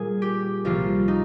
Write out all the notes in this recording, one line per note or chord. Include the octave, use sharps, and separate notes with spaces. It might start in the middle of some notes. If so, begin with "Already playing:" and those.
Already playing: A#2 G3 A#3 G#4 A#4
G4
C2 C3 F3 A#3 F4
D#4